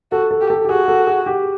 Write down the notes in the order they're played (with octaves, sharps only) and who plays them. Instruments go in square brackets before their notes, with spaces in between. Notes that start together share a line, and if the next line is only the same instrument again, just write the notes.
[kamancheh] F#4 [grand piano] A4
[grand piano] A4
[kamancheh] G4
[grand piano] A4
G4
[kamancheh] F#4 [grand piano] G#4
[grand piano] A4
G#4
G4